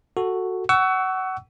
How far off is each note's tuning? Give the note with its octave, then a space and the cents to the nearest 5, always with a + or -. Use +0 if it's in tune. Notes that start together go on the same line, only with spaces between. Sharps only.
F#4 +0 A4 +10
F#5 +25 C#6 +25 E6 +0